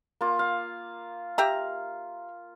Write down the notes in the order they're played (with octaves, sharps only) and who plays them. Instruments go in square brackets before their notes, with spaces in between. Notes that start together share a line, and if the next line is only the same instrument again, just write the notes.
[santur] A#3 F4
F5
[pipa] G4 E5 A#5